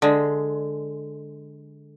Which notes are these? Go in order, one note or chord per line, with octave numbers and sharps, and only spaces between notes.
D3 G#3